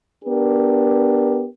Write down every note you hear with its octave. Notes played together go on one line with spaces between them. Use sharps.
B3 D4 G4 A#4